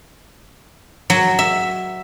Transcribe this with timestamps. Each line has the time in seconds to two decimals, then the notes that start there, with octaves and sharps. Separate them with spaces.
1.10 F#3
1.39 E5